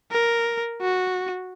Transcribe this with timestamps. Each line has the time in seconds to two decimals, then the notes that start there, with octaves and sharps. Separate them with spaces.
0.12 A#4
0.81 F#4